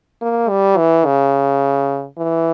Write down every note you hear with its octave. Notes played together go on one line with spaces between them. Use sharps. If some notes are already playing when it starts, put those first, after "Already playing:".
A#3
G3
E3
C#3
E3